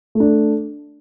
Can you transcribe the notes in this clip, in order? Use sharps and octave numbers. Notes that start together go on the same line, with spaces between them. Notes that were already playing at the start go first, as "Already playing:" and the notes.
A3
D4